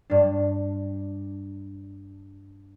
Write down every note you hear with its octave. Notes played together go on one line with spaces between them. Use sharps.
G2 D4